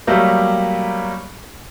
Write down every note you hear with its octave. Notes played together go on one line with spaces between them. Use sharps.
F#3 G3 A3 A#3 G4